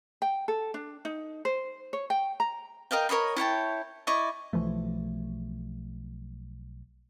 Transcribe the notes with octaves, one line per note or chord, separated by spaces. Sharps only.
G5
A4
D4
D#4
C5
C#5
G5
A#5
A#4 D#5 F5 G5
A#4 C#5 D#5 B5
E4 C#5 G5 A5
E4 D5 D#5 C#6
B1 E3 F3 A3